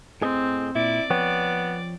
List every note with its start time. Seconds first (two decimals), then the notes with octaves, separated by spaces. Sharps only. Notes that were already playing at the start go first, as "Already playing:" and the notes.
0.22 A2 C4 G#4 D#5
0.75 A#2 E4 D5 D6
1.10 F3 B3 C#5 G5